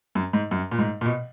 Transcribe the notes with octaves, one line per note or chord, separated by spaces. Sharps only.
F#2
G#2
F#2
A#2
G#2
A#2
B2